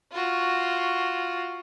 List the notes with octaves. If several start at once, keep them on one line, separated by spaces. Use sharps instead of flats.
F4 F#4